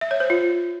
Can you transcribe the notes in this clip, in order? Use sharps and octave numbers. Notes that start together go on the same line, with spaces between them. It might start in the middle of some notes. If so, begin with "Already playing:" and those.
E5
C#5
C5
F4